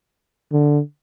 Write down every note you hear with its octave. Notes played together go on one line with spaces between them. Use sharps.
D3